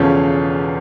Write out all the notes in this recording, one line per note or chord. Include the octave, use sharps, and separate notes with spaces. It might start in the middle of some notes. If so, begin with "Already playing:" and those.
Already playing: E1 E2 C#3 F3 C#4 A4